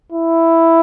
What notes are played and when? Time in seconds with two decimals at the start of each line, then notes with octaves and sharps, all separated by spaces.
0.12 E4